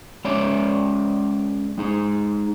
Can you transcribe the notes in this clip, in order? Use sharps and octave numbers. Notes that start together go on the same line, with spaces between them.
G#3 C#4 C#5 D5 E5
G#3 D#4 G#4